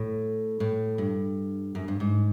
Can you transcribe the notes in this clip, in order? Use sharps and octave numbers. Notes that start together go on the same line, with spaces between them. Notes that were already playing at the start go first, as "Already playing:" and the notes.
Already playing: A2
A2
G2
F#2
G2
G#2